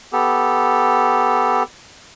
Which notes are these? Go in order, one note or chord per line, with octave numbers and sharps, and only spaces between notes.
B3 G4 A4